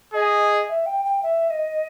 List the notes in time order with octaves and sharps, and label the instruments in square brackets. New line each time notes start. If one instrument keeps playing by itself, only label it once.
[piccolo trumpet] G#4 [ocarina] D#5
[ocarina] E5
G5
G5
E5
D#5